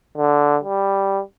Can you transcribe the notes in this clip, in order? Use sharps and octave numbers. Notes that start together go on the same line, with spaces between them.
D3
G3